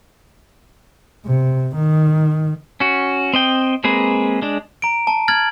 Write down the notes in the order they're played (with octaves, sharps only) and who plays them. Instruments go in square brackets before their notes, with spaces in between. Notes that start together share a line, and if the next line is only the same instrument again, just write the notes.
[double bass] C3
D#3
[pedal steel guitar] C#4 F#4
C4 D#5 G5
G#3 A#3 C4 G#4 B4
G#3 D4
[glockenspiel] A#5 D7
A5
F6 G#6 A6 F#7